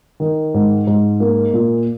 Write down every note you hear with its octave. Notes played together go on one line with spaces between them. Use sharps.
D#3
G#2
G#2
A#3
A#2